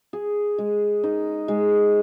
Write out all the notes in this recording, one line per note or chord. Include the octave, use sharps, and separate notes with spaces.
G#4
G#3
D#4
G#3